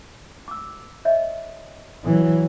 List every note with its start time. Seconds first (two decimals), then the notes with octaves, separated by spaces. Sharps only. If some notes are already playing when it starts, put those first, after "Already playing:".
0.48 D6 E6
1.05 C#5 D#5 E5
2.04 E3 F#3